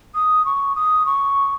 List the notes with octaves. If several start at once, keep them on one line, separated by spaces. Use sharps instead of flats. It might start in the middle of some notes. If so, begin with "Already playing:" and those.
D#6
C#6
D#6
C#6